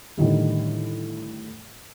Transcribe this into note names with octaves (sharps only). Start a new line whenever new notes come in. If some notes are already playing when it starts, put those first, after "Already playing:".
A2 D3 D#3 G3